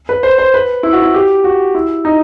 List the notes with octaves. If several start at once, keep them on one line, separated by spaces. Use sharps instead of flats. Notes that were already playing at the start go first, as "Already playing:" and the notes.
B4
C5
C5
B4
E4
F#4
E4
G4
F#4
E4
D#4